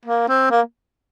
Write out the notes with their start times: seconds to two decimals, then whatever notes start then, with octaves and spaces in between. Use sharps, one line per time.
0.05 A#3
0.29 C4
0.51 A#3